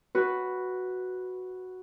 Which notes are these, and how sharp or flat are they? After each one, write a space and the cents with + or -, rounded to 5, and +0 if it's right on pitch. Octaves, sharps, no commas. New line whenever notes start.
F#4 +0 B4 +0